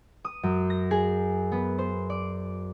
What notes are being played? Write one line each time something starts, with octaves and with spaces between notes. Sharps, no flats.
D#6
F#2
A#6
G#4
B3
C5
D5